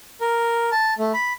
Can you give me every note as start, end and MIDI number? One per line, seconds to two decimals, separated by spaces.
0.21 0.70 70
0.72 0.94 81
0.98 1.12 57
1.14 1.33 83